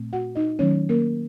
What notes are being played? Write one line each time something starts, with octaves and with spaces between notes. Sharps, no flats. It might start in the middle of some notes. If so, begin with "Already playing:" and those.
Already playing: A#2 A3 C4
F#4 F#5
D#4 D#5
D#3 F#3 A3 C#4 C#5
A#3 A#4